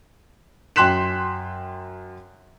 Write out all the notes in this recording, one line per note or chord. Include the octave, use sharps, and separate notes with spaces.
F#2 G5 C6 F#6 B6 E7